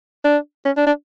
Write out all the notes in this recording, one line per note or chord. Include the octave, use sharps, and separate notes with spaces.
D4
C#4
D4
D4